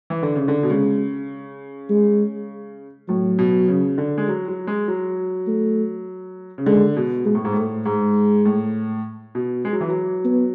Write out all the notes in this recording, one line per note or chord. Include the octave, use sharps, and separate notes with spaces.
E3
D3
C#3
D3
B2
C#3 G#3
G#3
A2 F#3
B2
C#3
D3
G#3
F#3
F#3
G#3
F#3
A3
C#3
D3 G#3
B2
B2 G#3
A2
G#2
A2 A3
G#2 G#3
A2
B2
G#3
F#3
E3
F#3
B3